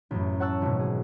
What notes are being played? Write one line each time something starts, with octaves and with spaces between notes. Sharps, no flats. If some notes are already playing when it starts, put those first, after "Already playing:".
A1 F#2
C#5 F#5 A5 C#6 E6 F#6
G#1 B2
G#4